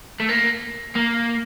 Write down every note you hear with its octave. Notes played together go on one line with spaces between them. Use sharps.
A3
A#3
A#3